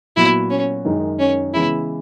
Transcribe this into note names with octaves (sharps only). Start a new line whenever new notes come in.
A#2 F#3 B3 E4 F#4
C#4
F#2 D#3 G#3 D#4 G#4
C#4
C#3 E3 G#3 B3 E4